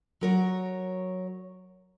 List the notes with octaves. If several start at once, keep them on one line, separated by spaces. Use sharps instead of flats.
F#3 A#4 C#5